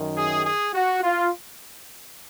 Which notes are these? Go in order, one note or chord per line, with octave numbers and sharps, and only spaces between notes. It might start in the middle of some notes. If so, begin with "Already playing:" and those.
Already playing: F#2 D#3
G#4
G#4
F#4
F4